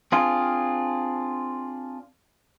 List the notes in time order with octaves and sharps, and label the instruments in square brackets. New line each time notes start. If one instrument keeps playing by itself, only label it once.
[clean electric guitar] C4 D4 F4 G#4